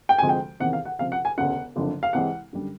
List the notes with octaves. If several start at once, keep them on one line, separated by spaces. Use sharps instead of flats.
G5
D2 C3 F3 G#3 G#5
G5
E2 C3 D#3 F#5
F5
F#5
C#2 C3 F3 F5
F#5
G#5
E1 D2 C#3 F#5
F#1 F2 D3
F5
C2 C3 E3 G#3 F#5
F#2 D3 G3